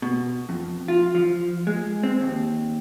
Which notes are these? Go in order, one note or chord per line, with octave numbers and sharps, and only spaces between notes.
B2
F2
F4
F3
G#3
C4
D#2